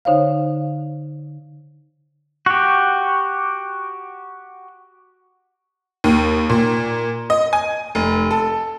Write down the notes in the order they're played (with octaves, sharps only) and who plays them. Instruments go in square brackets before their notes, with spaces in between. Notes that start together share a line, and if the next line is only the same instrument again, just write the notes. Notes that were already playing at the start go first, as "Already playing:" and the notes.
[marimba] D3 D#4 C5 C#5 F5
[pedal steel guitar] F#4 G4
[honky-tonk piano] D#2
A#2
D#5
G#5
F1
A4